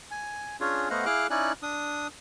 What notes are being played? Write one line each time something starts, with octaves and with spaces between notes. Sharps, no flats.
G#5
C#4 D4 F4 G#4 C#5
A3 B3 C5 D#5 F5 F#5
E4 G#4 F5 D6 F6 F#6
C#4 D#4 E4 D5 G#5 F#6
D4 D#6